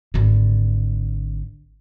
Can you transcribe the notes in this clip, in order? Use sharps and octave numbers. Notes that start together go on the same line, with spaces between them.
G#1 D3